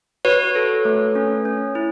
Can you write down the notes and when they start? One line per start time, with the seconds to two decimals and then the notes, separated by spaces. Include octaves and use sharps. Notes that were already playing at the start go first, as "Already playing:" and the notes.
0.25 F#4 B4 C#5
0.55 A4
0.85 A3
1.15 C#4
1.45 C#4
1.75 E4